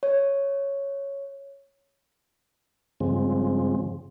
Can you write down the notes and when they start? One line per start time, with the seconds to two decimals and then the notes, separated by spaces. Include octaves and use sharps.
0.03 C#5
3.00 G2 C#3 F3 G#3 C4